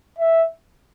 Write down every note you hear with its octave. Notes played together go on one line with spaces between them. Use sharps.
E5